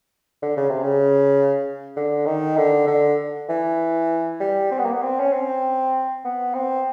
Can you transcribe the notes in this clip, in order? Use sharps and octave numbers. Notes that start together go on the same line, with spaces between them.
D3
C#3
C3
C#3
D3
D#3
D3
D3
E3
G3
C4
B3
A#3
B3
C4
C#4
C4
B3
C4